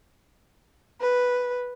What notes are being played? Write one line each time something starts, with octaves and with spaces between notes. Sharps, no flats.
B4